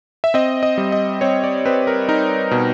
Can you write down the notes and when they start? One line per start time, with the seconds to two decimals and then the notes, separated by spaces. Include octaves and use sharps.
0.24 E5
0.34 C4 D#5
0.63 D#5
0.78 G3
0.92 D#5
1.21 C4 C#5
1.44 D5
1.65 C4 B4
1.87 A#4
2.09 D#4 A#4
2.51 B2